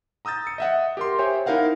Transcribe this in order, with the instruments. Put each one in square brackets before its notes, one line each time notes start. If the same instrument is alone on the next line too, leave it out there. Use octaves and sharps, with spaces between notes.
[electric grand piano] A#5 D#6 E6 G6 A6
C#7
D#5 E5 F#5
G4 A#4 C6
G4 C5 C#5 E5 G5 G#5
D#4 E4 A#4 F5 F#5